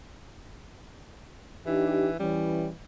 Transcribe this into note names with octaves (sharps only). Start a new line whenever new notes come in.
E3 D4 D#4 G4
E3 G3 C#4